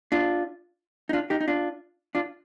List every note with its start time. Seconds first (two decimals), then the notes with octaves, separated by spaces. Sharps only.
0.12 D4 F4
1.09 D#4
1.13 D4 F4
1.30 D#4 G4
1.41 D#4
1.48 D4 F4
2.15 D4 F4